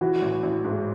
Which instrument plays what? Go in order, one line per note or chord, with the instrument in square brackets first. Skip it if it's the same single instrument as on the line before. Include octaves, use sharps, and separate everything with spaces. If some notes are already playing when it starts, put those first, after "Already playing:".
[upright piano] E3 [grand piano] F#4
[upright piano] A1
A1
G#2